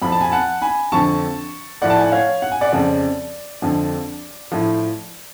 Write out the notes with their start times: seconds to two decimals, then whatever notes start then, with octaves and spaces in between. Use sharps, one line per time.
0.02 F2 F3 B5
0.12 A5
0.21 G#5 B5
0.32 F#5 A5
0.62 G#5 B5
0.92 F2 D3 F3 A5 C#6
1.81 A2 F3 D5 F#5
1.90 A5
1.98 G#5
2.04 F#5
2.12 C#5 F5
2.42 F#5
2.52 G#5
2.61 D5 F#5
2.72 F2 C#3 F3 D5
3.62 F2 D3 F3
4.52 A2 F3